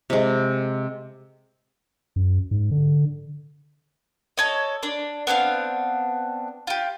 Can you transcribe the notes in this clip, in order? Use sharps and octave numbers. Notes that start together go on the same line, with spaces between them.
C3 G#3
F#2
G#2
D3
A4 C#5 D#5
D4 D5
B3 C4 D4 F5
F4 G4